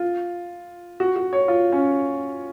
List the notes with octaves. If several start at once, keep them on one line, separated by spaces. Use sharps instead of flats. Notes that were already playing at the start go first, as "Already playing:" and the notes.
Already playing: F4
F#4
F#4
C#5
F4
C#4